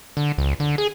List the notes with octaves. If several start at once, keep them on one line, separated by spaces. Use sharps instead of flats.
D3
C#2
D3
G#4